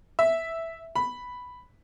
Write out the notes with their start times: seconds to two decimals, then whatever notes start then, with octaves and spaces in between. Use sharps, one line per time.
0.19 E5
0.96 B5